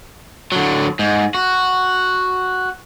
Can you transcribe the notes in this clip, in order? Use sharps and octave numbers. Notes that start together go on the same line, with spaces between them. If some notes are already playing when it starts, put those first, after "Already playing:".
D3 F#3
G#2
F#4